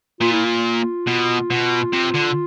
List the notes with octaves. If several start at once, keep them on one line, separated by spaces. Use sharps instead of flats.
A#2 F4
E4
F4
B2
B2
C3
D3